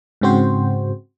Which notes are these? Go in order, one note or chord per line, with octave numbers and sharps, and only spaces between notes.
G#2 C#3 C4 F#4 C5